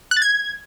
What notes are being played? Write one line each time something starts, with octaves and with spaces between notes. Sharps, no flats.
F#6
A6
G#6